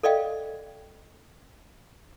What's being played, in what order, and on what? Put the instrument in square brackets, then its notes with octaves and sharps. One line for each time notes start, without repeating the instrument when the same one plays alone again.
[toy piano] A4 D5 D#5 F5 G5